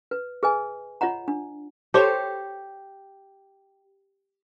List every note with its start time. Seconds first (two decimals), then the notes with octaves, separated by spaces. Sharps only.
0.11 B4
0.43 G#4 B4 D#5 G#5
1.01 F4 C#5 D#5 F#5 A#5
1.28 D4
1.94 G4 A4 C5 C#5